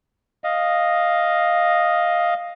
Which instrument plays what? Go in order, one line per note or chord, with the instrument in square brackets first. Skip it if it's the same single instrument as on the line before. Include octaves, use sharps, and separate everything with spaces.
[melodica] D#5 F5